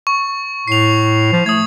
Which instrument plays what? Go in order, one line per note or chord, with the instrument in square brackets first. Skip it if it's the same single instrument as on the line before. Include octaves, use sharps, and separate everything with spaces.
[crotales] C#6
[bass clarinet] A2 [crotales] C7 F7
[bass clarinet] F3
[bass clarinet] A3 [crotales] D#6 G#6